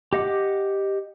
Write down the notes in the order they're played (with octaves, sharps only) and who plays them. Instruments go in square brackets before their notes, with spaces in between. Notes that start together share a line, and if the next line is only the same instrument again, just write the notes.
[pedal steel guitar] G4 D#5 F#5 D6